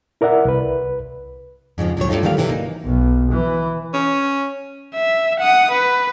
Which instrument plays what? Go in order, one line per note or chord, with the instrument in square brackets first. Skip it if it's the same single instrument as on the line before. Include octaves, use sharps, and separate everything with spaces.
[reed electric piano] E4 A#4 D5 E5 F#5
C2 B4
[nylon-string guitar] F2 G#2 C#3 F3
D2 A#2 F#3 C#5
G2 A3 D#4 F4
D#3 E3 F#3 G3 A#3 F5
G#2 C3 E3 F#3
A#3 D#4
[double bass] B1
E3
[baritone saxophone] C#4
[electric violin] E5
F#5 D#6
B4